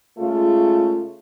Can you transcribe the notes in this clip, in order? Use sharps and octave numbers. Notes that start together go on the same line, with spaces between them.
C#3 G#3 A3 F4